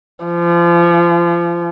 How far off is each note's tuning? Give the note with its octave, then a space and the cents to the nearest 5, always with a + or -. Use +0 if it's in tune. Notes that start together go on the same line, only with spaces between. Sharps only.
F3 -30